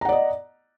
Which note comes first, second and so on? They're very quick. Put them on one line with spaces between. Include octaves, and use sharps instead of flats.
A#5 F#5 D5 D#5